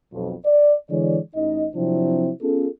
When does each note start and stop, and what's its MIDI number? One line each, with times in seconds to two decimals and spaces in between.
0.13 0.33 35
0.13 0.33 41
0.46 0.75 74
0.90 1.19 50
0.90 1.19 52
0.90 1.19 56
0.90 1.19 73
0.90 1.19 74
1.35 1.66 33
1.35 1.66 63
1.35 1.66 75
1.74 2.31 48
1.74 2.31 53
1.74 2.31 54
1.74 2.31 60
1.74 2.31 62
1.74 2.31 64
2.42 2.68 59
2.42 2.68 61
2.42 2.68 65
2.42 2.68 68
2.42 2.68 69